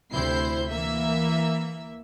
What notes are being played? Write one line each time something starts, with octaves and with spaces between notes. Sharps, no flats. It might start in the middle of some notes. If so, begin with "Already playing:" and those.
D2 C3 E4 C5 G6 C7
E3 A#3 E5